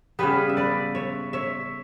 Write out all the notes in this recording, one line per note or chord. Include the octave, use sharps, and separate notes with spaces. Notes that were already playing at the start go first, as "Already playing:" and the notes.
C#3 G3 B3 G4 B4
E5
B4 D5
C#5 E5
C#5 E5